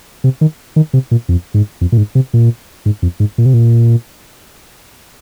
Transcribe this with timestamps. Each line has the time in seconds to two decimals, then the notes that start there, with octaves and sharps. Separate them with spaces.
0.24 C3
0.41 D#3
0.76 D#3
0.93 C3
1.11 A#2
1.29 F2
1.54 G#2
1.81 F2
1.92 A#2
1.97 G#2
2.15 C3
2.33 A#2
2.86 G#2
3.02 F2
3.20 G#2
3.38 A#2
3.46 C3
3.54 A#2